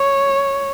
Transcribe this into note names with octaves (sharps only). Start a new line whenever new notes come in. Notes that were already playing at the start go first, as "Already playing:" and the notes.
Already playing: C#5